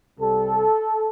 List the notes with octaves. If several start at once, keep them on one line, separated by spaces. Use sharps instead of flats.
C2 C3 G3 A4